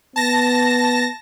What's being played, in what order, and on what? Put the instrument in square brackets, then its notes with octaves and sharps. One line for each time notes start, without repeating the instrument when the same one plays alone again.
[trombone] B3 [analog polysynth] A5 A#6